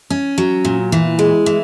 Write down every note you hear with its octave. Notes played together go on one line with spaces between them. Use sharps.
C#4
F#3
A#2
E3
G#3
E3